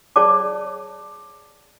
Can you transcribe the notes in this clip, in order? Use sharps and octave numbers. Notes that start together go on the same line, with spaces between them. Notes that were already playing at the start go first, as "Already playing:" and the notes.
G#4 C#5 D5 A5 D6